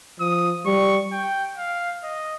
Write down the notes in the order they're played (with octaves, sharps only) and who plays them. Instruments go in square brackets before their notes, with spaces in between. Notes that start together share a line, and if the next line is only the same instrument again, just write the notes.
[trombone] F3 [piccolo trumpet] D#6
[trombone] G3 [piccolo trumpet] C#6
[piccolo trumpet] G5
F5
D#5